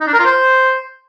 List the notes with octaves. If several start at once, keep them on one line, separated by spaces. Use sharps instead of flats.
D#4
D4
A#4
F4
C5